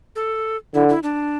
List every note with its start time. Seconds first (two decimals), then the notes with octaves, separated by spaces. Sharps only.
0.16 A4
0.74 D3 E4
0.89 E4
1.03 D4